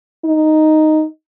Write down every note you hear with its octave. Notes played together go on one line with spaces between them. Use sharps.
D#4